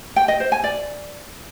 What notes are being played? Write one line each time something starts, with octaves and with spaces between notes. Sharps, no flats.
G5
D#5
C5
G#5
D5